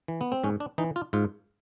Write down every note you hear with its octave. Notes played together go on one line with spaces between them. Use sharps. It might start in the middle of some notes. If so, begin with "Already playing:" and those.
E3
B3
C4
G#2 C#4
D4
E3 D#4
F4
G#2 F4